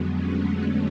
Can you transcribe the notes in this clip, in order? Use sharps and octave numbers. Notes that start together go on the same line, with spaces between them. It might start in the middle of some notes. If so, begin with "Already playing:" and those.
Already playing: F2 D3 F#3 G#3 B3
A3 C#4